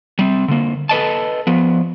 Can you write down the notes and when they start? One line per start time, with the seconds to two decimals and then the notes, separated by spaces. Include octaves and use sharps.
0.19 G3 C4
0.48 D3 A#3
0.89 A4 B4 D#5 A5
1.47 F3 B3